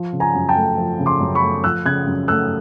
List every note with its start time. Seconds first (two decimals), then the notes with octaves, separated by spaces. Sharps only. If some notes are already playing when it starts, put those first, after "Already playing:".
Already playing: F3
0.13 C#3
0.20 G#5 A#5
0.35 F#2
0.49 G5 A5
0.56 A3
0.78 F3
0.99 C#3
1.06 C6 D6
1.21 F#2
1.35 B5 C#6
1.43 A3
1.64 F3 E6 F#6
1.85 C#3 F#6 G#6
2.07 F#2
2.28 A3 E6 F#6